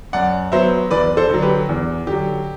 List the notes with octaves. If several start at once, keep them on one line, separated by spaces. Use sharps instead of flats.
F#2 D5 F#5
F#3 B3 C5 E5
E2 B4 D5
A4 C5
D3 F#3
G4 B4
E2
D3 F#3 G4